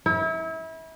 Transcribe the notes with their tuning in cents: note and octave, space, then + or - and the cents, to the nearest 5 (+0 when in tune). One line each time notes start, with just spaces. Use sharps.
E4 -30